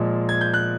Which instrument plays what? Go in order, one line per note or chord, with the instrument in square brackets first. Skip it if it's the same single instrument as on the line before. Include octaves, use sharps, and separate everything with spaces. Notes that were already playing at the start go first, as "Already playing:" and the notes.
Already playing: [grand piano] A#2 F3 G#3
G#6
G6
F#6